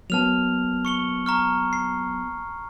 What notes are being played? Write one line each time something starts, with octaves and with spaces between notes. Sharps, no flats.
F#3 A#3 B3 A5 F6 F7
C#6 C#7 G7
A#5 C#6 F6
C7